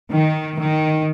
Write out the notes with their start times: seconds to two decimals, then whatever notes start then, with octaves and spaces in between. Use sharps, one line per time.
0.11 D#3
0.58 D#3